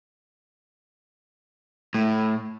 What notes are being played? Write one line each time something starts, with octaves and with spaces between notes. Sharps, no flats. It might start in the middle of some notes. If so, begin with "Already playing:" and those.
A2